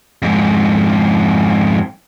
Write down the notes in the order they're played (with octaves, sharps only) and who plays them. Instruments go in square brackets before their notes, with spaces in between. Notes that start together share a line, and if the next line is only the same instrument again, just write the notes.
[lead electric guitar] F2 G#2